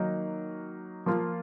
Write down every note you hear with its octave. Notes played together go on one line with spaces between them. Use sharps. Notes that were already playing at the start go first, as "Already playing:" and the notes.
Already playing: D#3 F#3 A#3 D#4 A#4
F3 A#3 F4